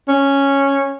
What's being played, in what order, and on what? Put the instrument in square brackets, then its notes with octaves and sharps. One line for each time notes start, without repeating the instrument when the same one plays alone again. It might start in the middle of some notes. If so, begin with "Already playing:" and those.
[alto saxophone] C#4